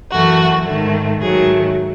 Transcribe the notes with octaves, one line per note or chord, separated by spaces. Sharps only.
F#2 E3 A3 F#4
G#2 D#3 A3
G#2 D#3 F#3 A3 G#4